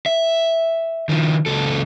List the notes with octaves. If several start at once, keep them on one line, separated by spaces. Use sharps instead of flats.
E5
D#3 F3
C#2 A4